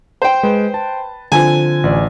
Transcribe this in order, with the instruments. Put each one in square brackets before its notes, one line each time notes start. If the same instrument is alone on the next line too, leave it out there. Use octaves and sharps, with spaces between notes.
[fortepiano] C5 G5
[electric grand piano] G#3 [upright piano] B4
[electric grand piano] A5
[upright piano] D3 F3 C4 [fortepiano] G#5
[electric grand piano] A1 D5